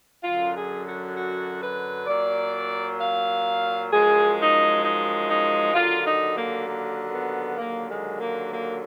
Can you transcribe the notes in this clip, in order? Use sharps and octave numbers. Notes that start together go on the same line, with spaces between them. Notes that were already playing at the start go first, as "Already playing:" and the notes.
F#2 D3 F#3 F4
G#4
F#4
F#4
B4
A#2 F#3 D5
F5
F#2 F3 G#3 G#4
D#4
D#4
D#4
D#2 D3 F#3 F4
D#4
A#3
A#3
B3
D#2 D3 F#3 A#3
G#3
A#3
A#3